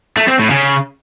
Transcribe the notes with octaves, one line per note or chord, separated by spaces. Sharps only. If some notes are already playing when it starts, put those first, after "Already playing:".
A3
C4
A2
C#3